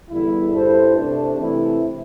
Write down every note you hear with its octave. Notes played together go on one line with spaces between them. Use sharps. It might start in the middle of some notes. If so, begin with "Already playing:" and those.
E2 D3 G3 E4
G2 G3 E4 A4 C5
C3 A3 D4
C3 E3 A3 E4